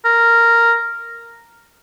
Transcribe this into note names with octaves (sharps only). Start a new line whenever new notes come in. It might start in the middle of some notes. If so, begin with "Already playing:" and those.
A#4